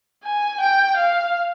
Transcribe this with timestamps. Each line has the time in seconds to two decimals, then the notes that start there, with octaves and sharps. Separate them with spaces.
0.24 G#5
0.60 G5
0.97 F5